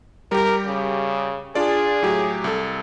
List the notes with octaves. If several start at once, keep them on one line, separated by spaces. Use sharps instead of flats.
G3 G4 A#4
C#3
D4 F4 G#4 D5
A2 F#3 G4
C2 A4